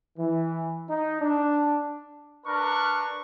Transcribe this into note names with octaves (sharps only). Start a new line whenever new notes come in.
E3
D#4
D4
D4 A#4 B4 C#6